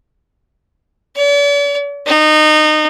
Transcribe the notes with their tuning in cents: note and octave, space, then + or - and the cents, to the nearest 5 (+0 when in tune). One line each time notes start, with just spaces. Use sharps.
D5 -45
D#4 -25